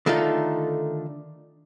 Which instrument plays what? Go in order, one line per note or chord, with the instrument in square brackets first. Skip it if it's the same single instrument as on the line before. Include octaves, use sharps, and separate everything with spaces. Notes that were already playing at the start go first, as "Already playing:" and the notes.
[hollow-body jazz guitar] D3 D#3 A3 D#4 F4 A4